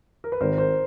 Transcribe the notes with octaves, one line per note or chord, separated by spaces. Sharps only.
A#4
B4
G#1 A#4 C5
A#4 C5